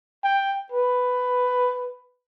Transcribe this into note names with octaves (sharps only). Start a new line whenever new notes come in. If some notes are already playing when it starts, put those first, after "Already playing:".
G5
B4